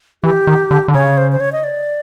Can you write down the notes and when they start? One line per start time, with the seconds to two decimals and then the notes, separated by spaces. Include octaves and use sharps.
0.24 E3 G4
0.47 D#3
0.71 D3
0.88 D3
0.94 C#3 C#5
1.17 C5
1.32 C5
1.40 C#5
1.52 D#5
1.64 D5